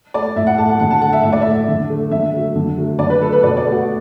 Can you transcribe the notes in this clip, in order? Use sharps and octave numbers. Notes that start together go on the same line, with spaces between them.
A3 D5
A2 E5
F#5
A3 A5
F#5
D3 F#5
A5
A3 F#5
E5
A2 E5
D5
A3 E5
D3
A3
D3 E5
F#3 A3
D3
F#3 A3
D3 D5
B4
A3 A4
B4
B2 D5
D5
A3
F#4